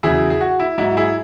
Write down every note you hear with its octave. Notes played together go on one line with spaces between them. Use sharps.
E2 C#3 F#3 E4 G#4
G#4
F#4
E4
G#2 F#3 E4
E4 G#4